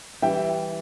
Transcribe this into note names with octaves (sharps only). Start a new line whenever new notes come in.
E3 G3 E5 G5